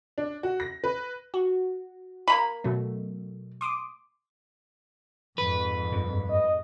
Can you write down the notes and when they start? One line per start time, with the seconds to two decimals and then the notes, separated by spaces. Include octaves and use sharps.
0.18 D4
0.43 F#4
0.60 A#6
0.84 B4
1.34 F#4
2.28 A#3 A#5 B5
2.64 B2 F#3 A3
3.61 C6 D6 D#6
5.38 F2 G#2 B4
5.92 G2 A#2
6.30 D#5